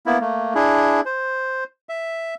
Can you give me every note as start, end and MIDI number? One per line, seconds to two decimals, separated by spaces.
0.06 0.19 58
0.06 0.19 59
0.06 0.19 64
0.21 0.54 57
0.21 0.54 58
0.55 1.01 62
0.55 1.01 64
0.55 1.01 68
1.06 1.64 72
1.89 2.35 76